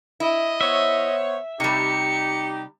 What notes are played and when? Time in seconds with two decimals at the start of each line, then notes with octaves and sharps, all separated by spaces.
0.20 E4 D#5
0.61 B3 C5 C#5 E5
1.60 C3 G3 D#4 G4 C#7